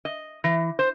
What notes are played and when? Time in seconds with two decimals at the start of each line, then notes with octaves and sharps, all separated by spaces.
0.05 D#5
0.44 E3
0.79 C5